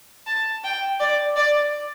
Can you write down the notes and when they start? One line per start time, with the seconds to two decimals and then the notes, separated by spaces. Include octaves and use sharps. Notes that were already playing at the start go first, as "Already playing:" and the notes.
0.26 A5
0.64 G5
1.00 D5
1.36 D5